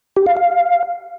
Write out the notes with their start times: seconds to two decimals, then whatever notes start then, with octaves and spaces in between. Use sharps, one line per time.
0.16 G4
0.26 F5
0.37 F5